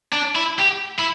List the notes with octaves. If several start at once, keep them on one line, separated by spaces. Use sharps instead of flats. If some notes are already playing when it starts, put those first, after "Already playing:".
D4
E4
G4
E4